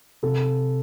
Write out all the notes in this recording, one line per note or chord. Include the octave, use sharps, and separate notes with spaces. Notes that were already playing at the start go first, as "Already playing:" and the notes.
C3 A4